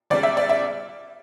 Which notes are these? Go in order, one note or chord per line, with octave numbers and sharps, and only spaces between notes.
C#2 C#3 G3 D5
E5
D5
E5